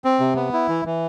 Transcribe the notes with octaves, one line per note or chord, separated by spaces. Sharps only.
C4
C3
B3
E4
E3
E3